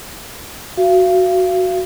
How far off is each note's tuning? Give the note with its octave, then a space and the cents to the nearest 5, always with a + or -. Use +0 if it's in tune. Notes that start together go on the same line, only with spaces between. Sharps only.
F#4 +0 F5 -35